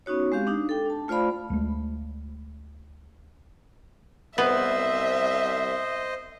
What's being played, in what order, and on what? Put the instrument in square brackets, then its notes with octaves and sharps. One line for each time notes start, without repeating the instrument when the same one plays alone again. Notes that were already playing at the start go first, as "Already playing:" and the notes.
[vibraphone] B3 C#4 D#4 F#4 C#5
G#3 C4 G4 F5
D4 D#4
A4 G5
D4 A5
A3 F4 C5 D5 F5 B5
[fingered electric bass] D2 G#3 A3
[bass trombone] C2 [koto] B3 [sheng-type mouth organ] C5 D#5 [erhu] E5